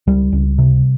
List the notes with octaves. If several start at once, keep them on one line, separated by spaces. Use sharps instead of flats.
C#2 G3
C#2
C3